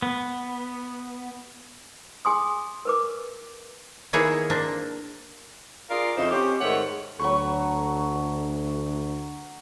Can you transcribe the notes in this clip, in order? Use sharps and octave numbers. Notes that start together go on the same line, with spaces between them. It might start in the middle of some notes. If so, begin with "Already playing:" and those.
B3
G#4 G#5 C6 D#6
A#4 B4 D6
D#3 A#3 B3 E4 G#4 C#5
A#3 C4 D4
F4 G#4 A#4 D5 F5
F2 C#3 D#4 E4 C5
C4 C#4 G4
G#2 D#3 A3 C#5 F#5
D2 F#3 A4 B5 C#6